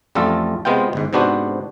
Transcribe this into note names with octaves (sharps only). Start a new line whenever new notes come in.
A1 F2 G3 A3 F4 A4
C3 G#3 B3 F4 G5
G1 G#2
G#2 C3 B3 D4 F#4 C5